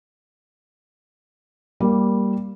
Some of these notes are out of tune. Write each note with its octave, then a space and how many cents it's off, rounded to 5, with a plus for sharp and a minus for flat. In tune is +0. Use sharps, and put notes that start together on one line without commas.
G3 +0 A#3 +0